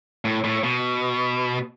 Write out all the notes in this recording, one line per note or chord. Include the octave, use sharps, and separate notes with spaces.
A2
A2
B2